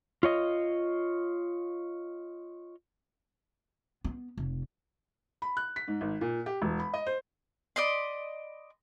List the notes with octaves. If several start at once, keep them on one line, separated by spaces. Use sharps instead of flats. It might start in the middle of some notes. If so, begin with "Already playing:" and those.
F4 C#5 D#5
B3
F1
B5
F#6
B6
G#2
G#1
A#2
G4
E1
B5
D#5
C5
D5 D#5 B5 C6